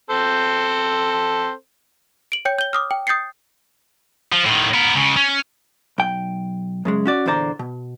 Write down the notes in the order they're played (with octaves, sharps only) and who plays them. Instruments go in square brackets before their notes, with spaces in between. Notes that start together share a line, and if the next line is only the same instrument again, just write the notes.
[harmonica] C4 A4 C5
[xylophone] D7 F#7
C#5 G5 G6 C#7
G6 G7
D6 D#6 F6
G5
D#6 G6 A6 C7 C#7
[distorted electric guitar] F3
A2 D#3
B3 A#4
C#2 C#3
C#4
[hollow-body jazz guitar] B1 G5
F#2 C#3 G#3
C#4 F#4 D5
E2 A#2 D3 C5 D5 A#5
B2